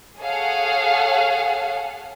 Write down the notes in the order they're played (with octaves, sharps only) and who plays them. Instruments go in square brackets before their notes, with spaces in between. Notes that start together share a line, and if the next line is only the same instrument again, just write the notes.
[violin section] G#4 A4 C#5 F5 F#5